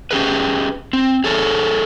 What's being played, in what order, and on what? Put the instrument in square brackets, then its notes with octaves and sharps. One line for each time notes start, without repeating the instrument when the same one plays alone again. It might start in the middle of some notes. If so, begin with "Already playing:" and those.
[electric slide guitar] C#4 G4 G#4 B4
C4
G#4 A4 C#5